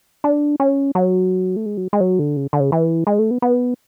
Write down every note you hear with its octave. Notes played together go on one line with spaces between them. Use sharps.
D4
C#4
F#3
A3
G#3
F#3
G#3
F#3
D3
C#3
D3
C#3
E3
G#3
A3
B3
B3